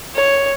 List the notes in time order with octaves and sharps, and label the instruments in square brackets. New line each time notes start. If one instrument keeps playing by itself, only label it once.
[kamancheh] C#5